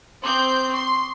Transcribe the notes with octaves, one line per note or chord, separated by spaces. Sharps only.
C4 C6 D6 D#6 G6
C6 C#6